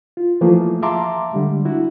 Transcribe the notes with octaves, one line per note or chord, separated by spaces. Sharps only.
F4
E3 F3 A3 A#3 G#4
E5 F5 A5 A#5 C6 D6
D3 G3 G#3
D4 E4 F#4